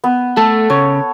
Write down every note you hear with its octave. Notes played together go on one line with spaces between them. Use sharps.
B3
A3 A4
C#3 C#5